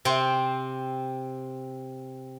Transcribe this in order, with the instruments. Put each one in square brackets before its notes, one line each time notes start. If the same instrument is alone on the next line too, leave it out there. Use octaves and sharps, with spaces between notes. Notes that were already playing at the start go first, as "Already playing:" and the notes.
[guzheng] C3 C4